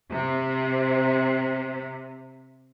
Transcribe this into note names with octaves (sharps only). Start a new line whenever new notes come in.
C3